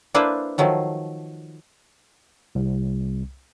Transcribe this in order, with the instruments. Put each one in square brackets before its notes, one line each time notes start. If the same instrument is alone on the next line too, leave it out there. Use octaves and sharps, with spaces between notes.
[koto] A#3 D4 E4 B4 C5
D#3 F3 F#3 A3
[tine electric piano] C2